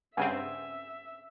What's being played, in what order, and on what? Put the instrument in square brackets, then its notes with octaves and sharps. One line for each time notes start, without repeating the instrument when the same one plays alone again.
[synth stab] G2 C#3 C4 [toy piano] C#4 F#5 [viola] E5 [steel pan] G#5